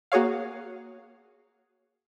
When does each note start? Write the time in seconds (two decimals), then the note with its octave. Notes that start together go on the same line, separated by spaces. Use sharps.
0.12 A#3 F#4 G#4 C#5 F5